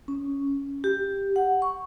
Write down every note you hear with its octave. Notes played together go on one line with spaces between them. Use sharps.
C#4
C#4
G4
F#5
C#6